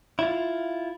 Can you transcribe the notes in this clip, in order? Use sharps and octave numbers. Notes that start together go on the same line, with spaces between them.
E4 F4